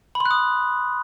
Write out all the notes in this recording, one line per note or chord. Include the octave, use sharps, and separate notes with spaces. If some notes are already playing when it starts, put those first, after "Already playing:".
B5
C6
F#6
D#6